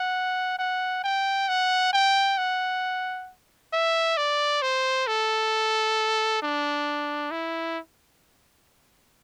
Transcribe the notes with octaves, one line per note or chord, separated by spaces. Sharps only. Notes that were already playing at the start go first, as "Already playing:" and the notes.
Already playing: F#5
F#5
G5
F#5
G5
F#5
E5
D5
C5
A4
D4
E4